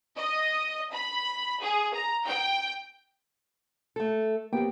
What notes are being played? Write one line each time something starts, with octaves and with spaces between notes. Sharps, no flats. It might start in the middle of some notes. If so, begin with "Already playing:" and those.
D#5
B5
G#4
A#5
G5
A3 A4
F2 A#3 B3 G4 G5